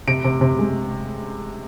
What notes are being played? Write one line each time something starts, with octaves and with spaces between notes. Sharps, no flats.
C3 D7
C3
C3
G#3